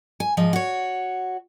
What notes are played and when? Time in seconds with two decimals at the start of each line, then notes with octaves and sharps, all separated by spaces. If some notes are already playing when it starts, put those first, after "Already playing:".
0.20 G#5
0.37 G#2 F3 D#5
0.53 F#4 C#5